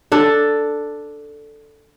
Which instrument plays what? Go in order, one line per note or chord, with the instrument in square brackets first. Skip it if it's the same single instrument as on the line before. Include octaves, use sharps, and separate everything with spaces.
[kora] D4 A4